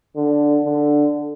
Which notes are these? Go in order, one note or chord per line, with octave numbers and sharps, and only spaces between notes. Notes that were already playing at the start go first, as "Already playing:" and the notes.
D3
D3